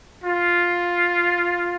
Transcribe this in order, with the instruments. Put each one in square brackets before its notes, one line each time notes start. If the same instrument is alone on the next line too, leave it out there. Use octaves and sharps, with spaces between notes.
[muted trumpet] F4